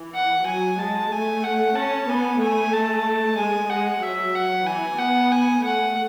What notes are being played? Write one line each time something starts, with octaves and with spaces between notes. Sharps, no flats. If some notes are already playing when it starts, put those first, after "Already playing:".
Already playing: E3
F#5
F#3 G#5
G#3 A5
A3 G#5
F#5
C#4 A5
B3 G#5
A3 G#5
A5
G#3 G#5
G#3 F#5
F#3 E5
F#5
E3 G#5
B3 F#5
G#5
A3 F#5